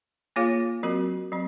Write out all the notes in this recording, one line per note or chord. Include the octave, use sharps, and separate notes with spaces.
A#3 F4 G#4 C#5 F5
F#3 C4 F#4 A#4
F#3 C4